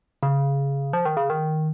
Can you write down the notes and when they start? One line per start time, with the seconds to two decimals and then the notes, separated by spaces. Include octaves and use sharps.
0.23 C#3
0.93 F3
1.05 D#3
1.17 C#3
1.30 D#3